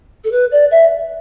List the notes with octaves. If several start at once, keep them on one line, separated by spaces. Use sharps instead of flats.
A4
B4
D5
E5